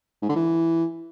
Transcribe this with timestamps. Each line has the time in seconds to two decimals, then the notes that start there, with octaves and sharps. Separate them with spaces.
0.22 G#2
0.29 D3
0.36 E3